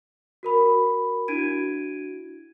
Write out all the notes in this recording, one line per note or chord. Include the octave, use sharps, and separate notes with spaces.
F#4 A#4 B5
D4 E4 F#4 G#6 D7 D#7